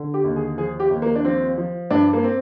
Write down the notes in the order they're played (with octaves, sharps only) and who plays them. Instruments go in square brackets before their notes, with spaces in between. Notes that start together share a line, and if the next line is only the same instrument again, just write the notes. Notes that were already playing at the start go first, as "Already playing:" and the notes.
Already playing: [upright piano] D3
G4
D#2
G#4
F3 G#4
G4
D#2
A#3
D4
F3 C4
F3
G2 D4
A#3
C4